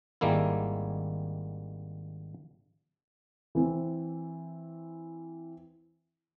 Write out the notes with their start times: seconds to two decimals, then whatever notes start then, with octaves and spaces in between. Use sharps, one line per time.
0.21 G#1 G3 G#3 A#3 E4
3.55 E3 C4